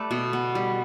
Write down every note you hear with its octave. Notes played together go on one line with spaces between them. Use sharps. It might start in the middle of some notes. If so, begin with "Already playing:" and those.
Already playing: A3 G4 A4 B4 D5
B2
B3
G3